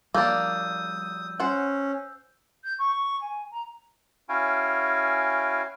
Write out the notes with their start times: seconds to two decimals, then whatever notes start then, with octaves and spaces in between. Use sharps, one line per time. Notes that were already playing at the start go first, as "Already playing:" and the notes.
0.14 F3 G3 A#3 D4 D#6 E6 G6
1.40 C#4 C5 F#5
2.64 G6
2.79 C#6
3.21 G#5
3.52 A#5
4.29 C#4 E4 F#4 F5 G5 G#5